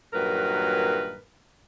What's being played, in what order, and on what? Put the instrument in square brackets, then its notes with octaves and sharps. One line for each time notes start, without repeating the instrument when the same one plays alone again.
[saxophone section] G2 A#2 D#3 F#3 A#4 B4